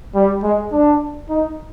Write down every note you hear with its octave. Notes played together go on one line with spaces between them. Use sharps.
G3
G#3
D4
D#4